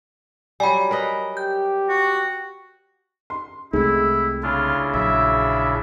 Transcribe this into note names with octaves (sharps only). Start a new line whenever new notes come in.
F#3 G3 G#5 B5
A#4 B4 D#5
G4 G6
F#4
C6
C2 C3 G#3 A3 E4
C#3 D4 E4 F4
A#1 F#3 E5